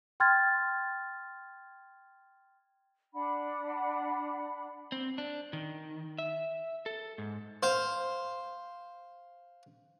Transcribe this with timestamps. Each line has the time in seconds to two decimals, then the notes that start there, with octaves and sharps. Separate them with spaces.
0.20 G5 C6 F6 G#6 A6
3.13 D4 F#5 B5
4.92 C4
5.18 D4
5.53 D#3
6.18 E5
6.86 A4
7.18 G#2
7.63 C5 F5